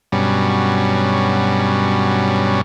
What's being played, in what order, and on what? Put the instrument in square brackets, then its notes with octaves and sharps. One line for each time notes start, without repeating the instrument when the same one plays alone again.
[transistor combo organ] G2 B2 F#3 G3 C#4